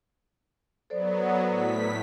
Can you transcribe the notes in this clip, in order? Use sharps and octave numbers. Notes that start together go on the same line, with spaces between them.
F#3 B3 A4 C5 D5
A2 B6